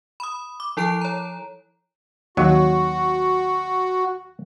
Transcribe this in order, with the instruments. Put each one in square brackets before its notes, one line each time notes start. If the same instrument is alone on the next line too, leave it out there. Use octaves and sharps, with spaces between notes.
[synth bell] B5 D#6
D6
F3 E4 A4 A5 D7
C#5 A#5
[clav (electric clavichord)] D#2 F#3 [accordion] F#4